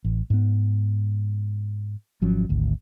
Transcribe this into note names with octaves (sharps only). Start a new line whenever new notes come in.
A1
G#2 B3
G#1 F3 F#3 C#4
G#1 D2